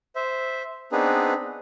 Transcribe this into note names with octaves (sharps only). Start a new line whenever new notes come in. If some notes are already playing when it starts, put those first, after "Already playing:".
C5 E5
B3 C4 D4 D#4 G#4 B4